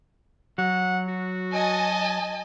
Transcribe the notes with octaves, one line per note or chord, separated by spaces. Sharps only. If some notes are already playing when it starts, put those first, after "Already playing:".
F#3 F#5
F#4
D#5 G#5 A5